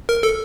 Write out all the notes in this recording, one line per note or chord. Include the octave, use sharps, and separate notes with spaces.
A#4
A4